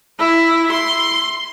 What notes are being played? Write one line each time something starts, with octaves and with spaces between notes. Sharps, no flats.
E4
C6